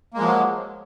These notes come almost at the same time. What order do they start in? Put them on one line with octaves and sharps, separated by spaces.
A#3 G#3 F3 F#3